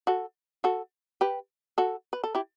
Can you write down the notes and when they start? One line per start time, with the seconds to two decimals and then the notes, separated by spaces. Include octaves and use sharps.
0.07 F#4 A4
0.64 F#4 A4
1.21 G4 B4
1.78 F#4 A4
2.13 B4
2.24 A4
2.35 E4 G4